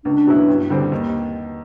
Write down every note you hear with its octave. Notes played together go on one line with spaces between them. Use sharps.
C#2 D4
B2 F#3 B3 E4
G2
D3 G3 C4
D#2